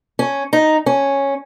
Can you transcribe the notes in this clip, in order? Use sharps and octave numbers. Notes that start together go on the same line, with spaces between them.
C#4
D#4
C#4